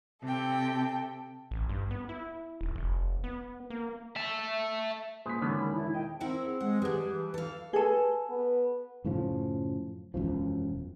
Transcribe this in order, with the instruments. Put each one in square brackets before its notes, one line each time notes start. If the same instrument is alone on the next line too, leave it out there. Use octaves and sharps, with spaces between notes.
[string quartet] C3 A4 G5
[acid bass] A1
G2
B3
E4
D#1
F1
B3
A#3
[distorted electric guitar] E5 A5
[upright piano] A#2 B6 [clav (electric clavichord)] G#4 B4 C5
[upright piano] E1 D#3 A5 [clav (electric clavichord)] D3 B3 C#4
[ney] B5
E4
[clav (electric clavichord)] D#5 [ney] G5
[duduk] C4 [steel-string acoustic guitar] E4 A#4 F#5
[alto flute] G#4
[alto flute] G#3 [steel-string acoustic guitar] F#5
[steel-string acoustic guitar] G3 D4 [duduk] G#4 [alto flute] B4
[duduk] E3
[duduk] E3 [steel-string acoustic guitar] A4 F5
[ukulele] G#4 A4 [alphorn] B4
[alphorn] B3
[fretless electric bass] F#2 A2 C#3 F3
E1 F#2 F3